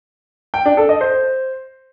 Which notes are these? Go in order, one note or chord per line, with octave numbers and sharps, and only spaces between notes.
G5
D4
A4
D#5
C5